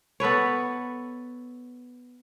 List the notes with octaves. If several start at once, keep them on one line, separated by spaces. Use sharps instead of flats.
B3 A4 B4 C#5